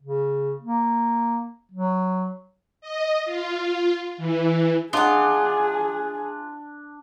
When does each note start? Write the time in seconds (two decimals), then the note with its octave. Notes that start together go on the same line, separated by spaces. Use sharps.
0.02 C#3
0.60 A#3
1.72 F#3
2.81 D#5
3.25 F4
4.18 E3
4.93 D4 F4 G#4 D#5 F#5